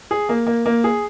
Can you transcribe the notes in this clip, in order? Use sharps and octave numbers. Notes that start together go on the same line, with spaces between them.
G#4
A#3
A#3
A#3
G#4